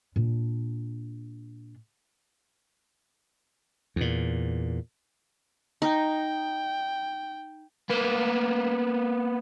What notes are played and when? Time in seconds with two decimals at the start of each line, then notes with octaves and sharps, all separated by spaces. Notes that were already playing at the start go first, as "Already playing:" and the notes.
0.16 A#2 D4
3.96 E2 A#2
5.82 D#4 G5
7.89 A#3 B3